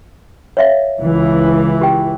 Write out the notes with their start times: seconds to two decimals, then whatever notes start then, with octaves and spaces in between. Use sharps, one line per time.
0.57 C#5 E5 F5
1.00 C#2 E3
1.81 G4 G5